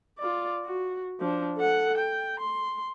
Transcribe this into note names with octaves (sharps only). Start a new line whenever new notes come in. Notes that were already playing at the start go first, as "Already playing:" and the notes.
F4 D5
F#4
F3 D4
A4 F#5
G5
C6